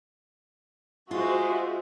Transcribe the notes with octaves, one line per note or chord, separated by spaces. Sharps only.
G#3 F4 F#4 C5 E5